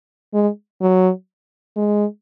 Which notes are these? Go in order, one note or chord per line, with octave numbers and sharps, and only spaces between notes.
G#3
F#3
G#3